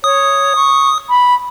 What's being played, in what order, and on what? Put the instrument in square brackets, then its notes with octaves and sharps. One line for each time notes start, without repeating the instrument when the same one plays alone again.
[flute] C#5 [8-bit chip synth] D#6
[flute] C#6
B5